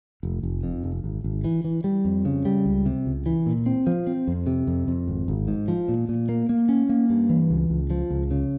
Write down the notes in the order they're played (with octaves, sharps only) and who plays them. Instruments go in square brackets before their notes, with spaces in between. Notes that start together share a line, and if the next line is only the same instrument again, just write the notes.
[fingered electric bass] F1
F1
F2
F1
G#1
G#1
E3
E3
G3
F2
C#3
G3
C#2
C3
C#2
E3
A#2
C4
F3
C4
F2
C3
F2
F2
G#1
G#1
G#2
F3
A#2
A#2
A#3
A#3
C#4
A#3
G2
E3
C#2
C#2
F3
C#2
C#3